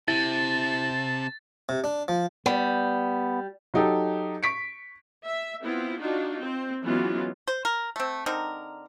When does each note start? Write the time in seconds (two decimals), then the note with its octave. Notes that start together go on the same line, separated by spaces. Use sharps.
0.08 C3 E4 A5 A6
1.69 C3
1.84 D4
2.08 F3
2.46 G3 B3
3.74 F#3 D#4 G4 A4
4.43 C#6 B6 D7
5.25 E5
5.62 B3 C4 E4 F4
5.99 D4 D#4 F4 F#4
6.41 C4 C5
6.84 E3 F#3 G#3 B3 C#4 F4
7.48 C5
7.65 A#4
7.96 A3 C4
8.26 D3 C4 D#4 A#4